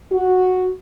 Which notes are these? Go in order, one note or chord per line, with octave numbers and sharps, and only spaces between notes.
F#4